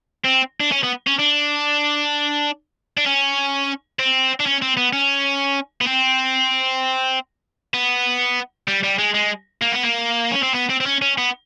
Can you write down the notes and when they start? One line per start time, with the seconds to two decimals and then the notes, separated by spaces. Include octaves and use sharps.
0.24 C4
0.60 D4
0.72 C#4
0.83 B3
1.07 C#4
1.19 D4
2.98 D4
3.06 C#4
3.99 C4
4.40 D4
4.46 C#4
4.62 C4
4.77 B3
4.93 C#4
5.81 B3
5.87 C4
7.74 B3
8.68 G3
8.84 G3
8.98 G#3
9.14 G#3
9.62 A#3
9.72 B3
9.83 A#3
10.32 C#4
10.43 C4
10.55 B3
10.70 C4
10.81 C4
10.86 C#4
11.02 C#4
11.18 B3